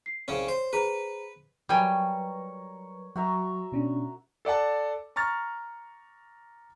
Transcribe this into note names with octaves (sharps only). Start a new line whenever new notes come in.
C7
C2 C#3 C#4 C#5
C5
G#4 B4 C5 A#5
F#3 G3 A#4 B4 C#5 G5 G#5
F#3 F#4 E5 A#5
B2 C#4 D4
A4 D5 F#5 A5
A#5 C#6 F6 A6